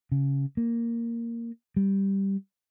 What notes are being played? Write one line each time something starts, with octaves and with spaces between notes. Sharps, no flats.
C#3
A#3
G3